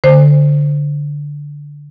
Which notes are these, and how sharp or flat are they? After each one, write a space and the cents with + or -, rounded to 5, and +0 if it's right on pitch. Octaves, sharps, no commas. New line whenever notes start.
D3 -5 C5 +0